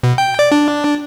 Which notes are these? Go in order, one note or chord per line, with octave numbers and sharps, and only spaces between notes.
B2
G5
D5
D4